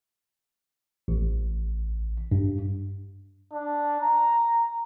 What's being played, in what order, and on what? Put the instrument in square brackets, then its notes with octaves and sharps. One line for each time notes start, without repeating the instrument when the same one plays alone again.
[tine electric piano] A1
G2
[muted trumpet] D4
A#5